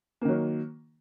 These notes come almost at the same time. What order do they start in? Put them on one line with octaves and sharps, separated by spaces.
A#3 D#3 F#3